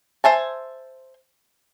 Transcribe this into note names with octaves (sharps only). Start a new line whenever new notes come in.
C5 E5 G#5 A5